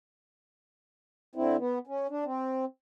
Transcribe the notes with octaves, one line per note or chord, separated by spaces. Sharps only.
D3 C4 E4
B3
C#4
D4
C4